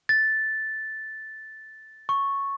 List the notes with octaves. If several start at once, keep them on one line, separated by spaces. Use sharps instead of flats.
A6
C#6